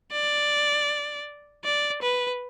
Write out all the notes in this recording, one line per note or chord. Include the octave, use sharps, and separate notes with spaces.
D5
D5
B4